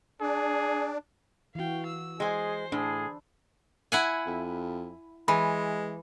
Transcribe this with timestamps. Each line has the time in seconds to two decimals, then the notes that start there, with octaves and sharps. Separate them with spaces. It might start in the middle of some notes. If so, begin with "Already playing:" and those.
0.21 D4 G#4
1.55 E3 F#4 F5 G5
1.87 E6
2.20 G#3 G#4 C5 G#5
2.72 A2 D4 G#4
3.92 E4 F#5 G#5
4.26 F2
5.28 E3 G#3 B5